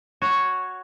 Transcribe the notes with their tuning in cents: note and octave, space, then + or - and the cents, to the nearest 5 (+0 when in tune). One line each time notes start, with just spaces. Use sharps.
F#4 +0 C#5 +0